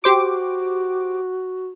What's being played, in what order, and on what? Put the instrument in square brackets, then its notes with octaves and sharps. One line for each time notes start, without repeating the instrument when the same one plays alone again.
[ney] F#4 [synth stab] G4 C5 D6